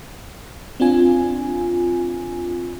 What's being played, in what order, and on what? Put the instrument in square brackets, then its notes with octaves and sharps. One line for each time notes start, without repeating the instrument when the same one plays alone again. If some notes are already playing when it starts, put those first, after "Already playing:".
[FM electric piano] C4 D4 F4 G#5